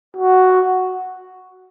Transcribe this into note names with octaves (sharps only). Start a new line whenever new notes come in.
F#4